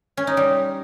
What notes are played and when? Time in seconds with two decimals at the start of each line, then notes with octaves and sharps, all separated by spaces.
0.17 C#4
0.27 D#4
0.37 G3